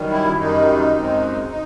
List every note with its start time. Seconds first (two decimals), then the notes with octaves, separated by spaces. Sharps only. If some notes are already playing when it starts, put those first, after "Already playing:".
Already playing: F#2 D#3 G3
0.11 E4
0.39 F#2 D#3 G3 D#4
0.95 F#2 D#3 G#3 C4
1.50 D#4